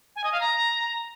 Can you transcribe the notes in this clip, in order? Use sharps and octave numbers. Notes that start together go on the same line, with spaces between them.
G#5
D#5
F5
A#5